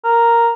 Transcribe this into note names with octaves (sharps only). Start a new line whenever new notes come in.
A#4